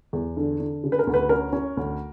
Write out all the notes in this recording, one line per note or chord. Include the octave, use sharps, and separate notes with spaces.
E2
D3
D3
C#3
B4
A#4
D2
B4
C#4 A#4
C#4
D2